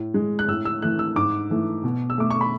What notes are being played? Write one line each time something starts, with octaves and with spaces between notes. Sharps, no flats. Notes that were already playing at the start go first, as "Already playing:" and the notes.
Already playing: A2
G#3
F#6
A2 E6
E6
E3 A3 F#6
E6
G#2 D6
E3 A3
B2
E6
A3 D6
C#6
B5